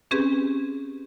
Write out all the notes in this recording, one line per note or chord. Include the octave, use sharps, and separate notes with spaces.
C4 C#4 G4 G#4 B4